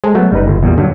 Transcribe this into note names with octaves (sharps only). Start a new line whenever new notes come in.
G#3 A4 C5
F#3 A3 B3
F#1 G3 D#4 B4
G1
E2 A#2 G3
G2 D3 F#3